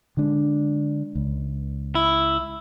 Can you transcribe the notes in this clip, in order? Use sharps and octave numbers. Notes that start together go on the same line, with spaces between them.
D3 G#3 D4
C#2
E4